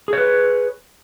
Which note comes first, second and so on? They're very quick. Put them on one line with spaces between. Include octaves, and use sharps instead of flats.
G#4 C#5 B4